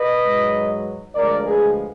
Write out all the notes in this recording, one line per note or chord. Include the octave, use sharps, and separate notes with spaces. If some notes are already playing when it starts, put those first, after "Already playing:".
Already playing: B4 D#5
G#2 F#3
D2 D3 F3 G#3 A#4 D5
G#4 B4